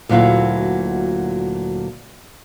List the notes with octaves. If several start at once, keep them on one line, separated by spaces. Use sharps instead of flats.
D2 A#2 F#3 E4 F4